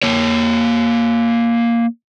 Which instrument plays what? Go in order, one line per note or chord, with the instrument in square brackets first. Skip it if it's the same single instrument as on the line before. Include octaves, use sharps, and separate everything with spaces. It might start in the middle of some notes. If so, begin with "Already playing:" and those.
[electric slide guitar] A#3 C#5